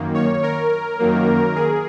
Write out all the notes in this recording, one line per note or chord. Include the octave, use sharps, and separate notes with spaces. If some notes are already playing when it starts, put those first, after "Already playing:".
Already playing: F#2 D#3 A#3
C#5
A#4
F#2 D#3 F#3 A#3
G#4